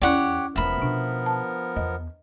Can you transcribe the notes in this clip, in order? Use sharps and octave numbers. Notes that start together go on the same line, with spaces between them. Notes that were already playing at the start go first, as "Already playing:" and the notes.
E2 C#4 E4 G4 C#5 D5 F#5
E1 F3 B3 F4 A#4 E5 B5
B2 D4
A5
E2 D#5